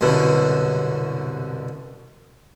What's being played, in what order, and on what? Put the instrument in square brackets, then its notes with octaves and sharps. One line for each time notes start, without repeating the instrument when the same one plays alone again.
[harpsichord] C2 F#2 B2 D3